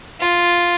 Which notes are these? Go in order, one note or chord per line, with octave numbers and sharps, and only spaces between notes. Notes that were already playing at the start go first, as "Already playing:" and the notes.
F4